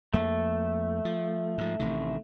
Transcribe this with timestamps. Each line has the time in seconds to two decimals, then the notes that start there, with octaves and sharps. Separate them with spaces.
0.14 F2 A3 A#3
1.05 F3
1.58 G#2 F3
1.79 A1 C3 D#3